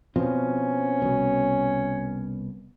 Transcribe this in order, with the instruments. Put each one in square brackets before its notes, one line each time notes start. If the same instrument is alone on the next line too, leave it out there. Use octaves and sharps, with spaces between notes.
[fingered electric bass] B2 F3 C4 [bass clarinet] C#4
[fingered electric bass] C2 B2 B3